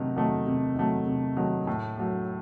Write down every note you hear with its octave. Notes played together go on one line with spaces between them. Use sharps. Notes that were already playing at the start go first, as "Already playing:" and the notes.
Already playing: C3 D#3 F#3 A3
D#3 F#3 A3
C3
D#3 F#3 A3
C3
D#3 F#3 A3
A2
F#3 A3